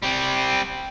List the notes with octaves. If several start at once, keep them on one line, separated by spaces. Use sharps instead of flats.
G3 C4